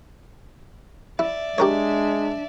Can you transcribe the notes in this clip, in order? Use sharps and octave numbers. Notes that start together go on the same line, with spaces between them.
E4 D5 E5
G#3 D4 G4 A#4 C#5